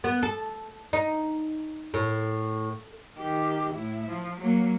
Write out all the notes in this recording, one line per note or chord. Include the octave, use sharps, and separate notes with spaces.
B3
A4
D#4
A2
D#3 G4
A2 E4
F3
F#3 A#3